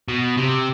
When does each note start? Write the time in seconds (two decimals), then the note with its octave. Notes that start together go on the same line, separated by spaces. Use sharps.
0.08 B2
0.37 C3